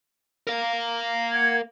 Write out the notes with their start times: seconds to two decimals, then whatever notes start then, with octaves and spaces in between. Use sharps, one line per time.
0.47 A#4 F5
1.32 F#5 G#6